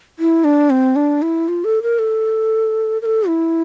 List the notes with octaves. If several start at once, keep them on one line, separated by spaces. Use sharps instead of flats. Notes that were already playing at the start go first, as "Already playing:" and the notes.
E4
D4
C4
D4
E4
F4
A4
A#4
A4
A#4
A4
E4